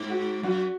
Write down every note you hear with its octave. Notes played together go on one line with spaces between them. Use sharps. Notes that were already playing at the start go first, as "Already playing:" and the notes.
Already playing: G#2
F#4
F#2 F#4